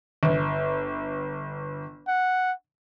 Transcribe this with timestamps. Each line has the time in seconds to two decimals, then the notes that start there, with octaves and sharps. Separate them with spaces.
0.23 G1
2.07 F#5